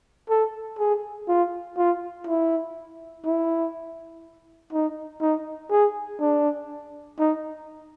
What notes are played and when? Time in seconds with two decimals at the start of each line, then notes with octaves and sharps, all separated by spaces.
0.29 A4
0.79 G#4
1.28 F4
1.77 F4
2.27 E4
3.25 E4
4.73 D#4
5.21 D#4
5.71 G#4
6.20 D4
7.19 D#4